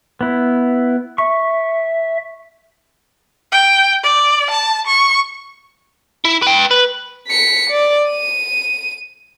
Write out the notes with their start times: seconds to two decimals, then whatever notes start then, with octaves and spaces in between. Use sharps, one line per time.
0.21 B3 E4
1.18 E5 C#6
3.52 G5
4.03 D5
4.50 A5
4.87 C#6
6.25 E4
6.42 B4 G5
6.71 B4
7.28 B6 C#7
7.70 D5
8.10 D#7